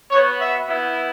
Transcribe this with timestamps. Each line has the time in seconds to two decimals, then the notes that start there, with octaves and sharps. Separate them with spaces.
0.11 B3 F#4 C#5
0.40 E5
0.68 B3 E4